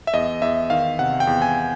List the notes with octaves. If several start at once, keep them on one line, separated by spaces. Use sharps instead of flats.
E5
E2 D#5
E2 E5
D#3 F5
C3 F#5
G5
E2
G#5